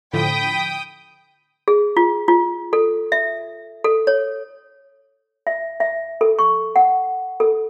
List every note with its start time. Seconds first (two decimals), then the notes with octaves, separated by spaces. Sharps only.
0.13 A2 D3 F3 G5 B5 D#6
1.68 G#4
1.97 F4
2.28 F4
2.73 A4
3.12 E5
3.84 A4
4.07 C#5
5.47 E5
5.80 E5
6.21 A4
6.39 C#6
6.76 F#5
7.40 A4